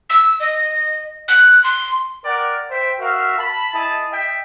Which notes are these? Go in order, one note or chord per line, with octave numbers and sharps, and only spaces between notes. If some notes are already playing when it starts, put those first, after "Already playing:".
E6
D#5
F#6
C6
A#4 D5 F#5 G5
C5 E5 G5
F#4 A#4 E5 F5
A5 B5
E4 G#4 D#5 A5
D#5 E5 G5